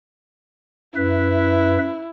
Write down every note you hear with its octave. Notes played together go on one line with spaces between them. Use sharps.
F#2 E4 B4 E5